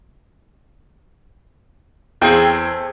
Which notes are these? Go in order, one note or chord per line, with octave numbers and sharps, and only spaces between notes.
E2 A3 C4 G#4 G5